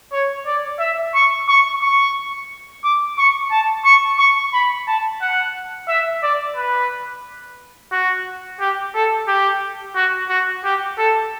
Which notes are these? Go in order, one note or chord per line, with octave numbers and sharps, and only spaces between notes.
C#5
D5
E5
C#6
C#6
C#6
D6
C#6
A5
C#6
C#6
B5
A5
F#5
E5
D5
B4
F#4
G4
A4
G4
F#4
F#4
G4
A4